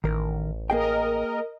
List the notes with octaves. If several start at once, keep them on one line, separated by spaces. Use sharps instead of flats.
A1 D#3 A#4
A#3 G#4 A#4 D#5 G5